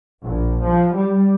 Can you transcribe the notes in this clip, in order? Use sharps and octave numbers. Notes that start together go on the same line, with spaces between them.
A#1
F3
G3